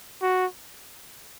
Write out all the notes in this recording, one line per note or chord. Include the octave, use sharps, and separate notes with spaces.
F#4